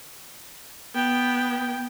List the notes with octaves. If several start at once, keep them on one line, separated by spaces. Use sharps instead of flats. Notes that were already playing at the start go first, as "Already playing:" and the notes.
B3 G5